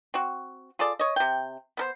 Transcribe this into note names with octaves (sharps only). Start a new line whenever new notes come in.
C4 F#4
F4 G#4 A4 D5
C#5 D#5
C3 G5
B3 A#4 C5